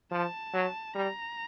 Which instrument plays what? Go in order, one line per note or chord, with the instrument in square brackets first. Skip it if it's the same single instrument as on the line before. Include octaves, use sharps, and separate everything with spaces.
[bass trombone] F3 [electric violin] A5
[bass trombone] F#3
[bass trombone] G3 [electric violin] A#5